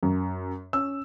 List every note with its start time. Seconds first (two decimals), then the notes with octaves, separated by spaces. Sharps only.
0.03 F#2
0.73 C#4 E6